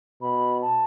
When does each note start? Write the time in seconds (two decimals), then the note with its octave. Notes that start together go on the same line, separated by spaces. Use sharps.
0.21 B2 B5
0.62 A5